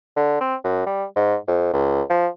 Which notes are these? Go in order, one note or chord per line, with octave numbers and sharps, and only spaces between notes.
D3
C4
F#2
G3
G#2
F2
C#2
F3